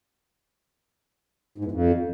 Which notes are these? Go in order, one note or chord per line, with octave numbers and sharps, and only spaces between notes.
G#2
E2
F2